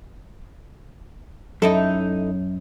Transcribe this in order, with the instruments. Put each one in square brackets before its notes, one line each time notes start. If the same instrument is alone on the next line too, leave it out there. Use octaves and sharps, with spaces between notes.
[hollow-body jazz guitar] F#2 [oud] D#4 E4 A4